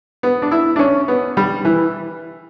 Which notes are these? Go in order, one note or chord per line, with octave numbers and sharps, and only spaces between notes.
B3
D4
E4
D4
C#4
B3
G3
E3